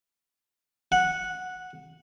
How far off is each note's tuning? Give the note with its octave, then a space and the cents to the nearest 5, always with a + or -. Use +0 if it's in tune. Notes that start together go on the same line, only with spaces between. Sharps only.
F#5 -10